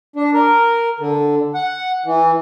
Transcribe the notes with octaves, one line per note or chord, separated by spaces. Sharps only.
D4
A#4
D3
F#5
E3